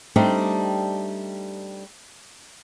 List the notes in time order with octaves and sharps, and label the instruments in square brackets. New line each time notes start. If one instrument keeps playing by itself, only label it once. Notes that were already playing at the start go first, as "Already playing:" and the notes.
[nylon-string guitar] G3 A3 C4 D4 D#4 G4